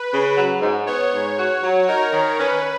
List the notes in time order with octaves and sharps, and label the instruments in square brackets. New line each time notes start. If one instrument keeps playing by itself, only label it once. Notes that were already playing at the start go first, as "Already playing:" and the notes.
Already playing: [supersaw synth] B4
[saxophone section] C#3
F#3
G#2
[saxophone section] B3 [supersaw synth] C#5
[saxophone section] G#2
F#4
F#3
[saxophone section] D#4 [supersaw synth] A#4
[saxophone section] D#3
[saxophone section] C#4 [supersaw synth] B4